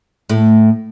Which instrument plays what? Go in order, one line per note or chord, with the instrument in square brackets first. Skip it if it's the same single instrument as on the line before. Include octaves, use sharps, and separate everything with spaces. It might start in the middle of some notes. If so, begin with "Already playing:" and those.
[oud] A2 A3